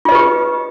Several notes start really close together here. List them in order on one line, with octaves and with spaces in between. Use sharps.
F4 D#5 B4 G4